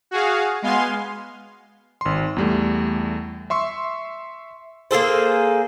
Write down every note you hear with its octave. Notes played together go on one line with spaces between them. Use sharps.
F#4 G#4 F5
G#3 B3 F5 G#5 C6
G#1 C6
E2 G3 A3
E5 C6 C#6 E6
A#3 G#4 A4 C5